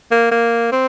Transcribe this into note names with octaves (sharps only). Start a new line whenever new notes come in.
A#3
A#3
C4